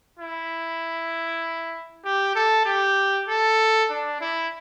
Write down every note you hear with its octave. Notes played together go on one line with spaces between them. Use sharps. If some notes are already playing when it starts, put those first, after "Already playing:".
E4
G4
A4
G4
A4
D4
E4